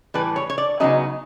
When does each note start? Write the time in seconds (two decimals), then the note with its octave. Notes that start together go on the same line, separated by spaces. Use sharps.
0.14 A2 E3 G3 B4
0.36 C#5
0.50 C#5
0.58 D5
0.80 C#3 F#3 B3 D#4 D#5